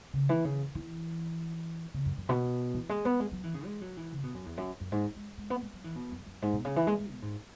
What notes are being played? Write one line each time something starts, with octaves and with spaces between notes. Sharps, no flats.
C#3
E3
C#3
E3
C#3
F#2
F#2
B2
E3
G#3
B3
G#3
F#3
E3
C#3
G#3
F#3
E3
C#3
B2
F#2
E2
F#2
F#2
G#2
G#3
G#3
B3
G#3
F#3
E3
B2
F#2
F#2
G#2
B2
C#3
E3
G#3
G#3
B2
G#2